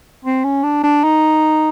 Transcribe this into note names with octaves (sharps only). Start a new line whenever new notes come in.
C4
C#4
D4
D4
D#4